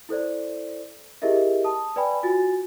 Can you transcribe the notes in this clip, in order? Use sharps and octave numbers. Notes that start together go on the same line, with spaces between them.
E4 A4 C5 D5
E4 G4 G#4 A#4 D#5 E5
A5 D#6
B4 D5 G5 G#5 B5
F4 F#4 G#5 A6